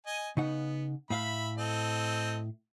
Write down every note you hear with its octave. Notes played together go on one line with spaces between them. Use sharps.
D#5 G#5
C#3 B3 D#4 F#5
A2 E5 F5 B5
C4 A4 D#5